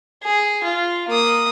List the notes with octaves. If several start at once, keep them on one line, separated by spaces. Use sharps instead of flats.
G#4
F4
A#3 D#6